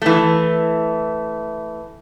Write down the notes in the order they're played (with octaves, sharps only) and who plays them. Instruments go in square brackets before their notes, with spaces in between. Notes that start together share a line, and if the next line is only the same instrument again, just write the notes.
[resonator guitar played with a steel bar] E3 A3